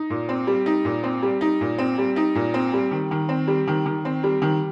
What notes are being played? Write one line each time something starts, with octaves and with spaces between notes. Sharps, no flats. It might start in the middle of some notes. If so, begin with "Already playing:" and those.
Already playing: D#4
A#2
C4
G3
D#4
A#2
C4
G3
D#4
A#2
C4
G3
D#4
A#2
C4
G3
D#3
D#3
C4
G3
D#3
D#3
C4
G3
D#3